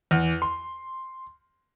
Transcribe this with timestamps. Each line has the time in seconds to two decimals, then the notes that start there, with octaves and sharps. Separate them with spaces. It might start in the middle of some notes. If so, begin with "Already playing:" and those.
0.11 E2
0.42 C6